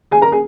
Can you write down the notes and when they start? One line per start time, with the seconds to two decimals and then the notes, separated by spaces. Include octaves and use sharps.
0.11 G#4 G#5
0.22 A#4 A#5
0.32 G#4 G#5